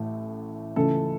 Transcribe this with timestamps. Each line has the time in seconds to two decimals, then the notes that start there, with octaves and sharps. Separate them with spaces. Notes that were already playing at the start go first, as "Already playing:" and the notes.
Already playing: A1 A2 A3
0.76 C#2 C#3 E3 A3 C#4 A4